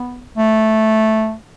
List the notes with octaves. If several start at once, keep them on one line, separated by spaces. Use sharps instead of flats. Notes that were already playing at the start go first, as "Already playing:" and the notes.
Already playing: B3
A3